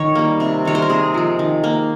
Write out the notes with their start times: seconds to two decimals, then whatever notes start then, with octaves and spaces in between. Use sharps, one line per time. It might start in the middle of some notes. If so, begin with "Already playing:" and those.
Already playing: D#3 C#5
0.15 G3 A#3
0.40 C3
0.65 D#3 G3 C#5
0.75 C5
0.82 A#4
0.90 C3 G#4
1.14 F3 G#3
1.39 D#3
1.64 A#3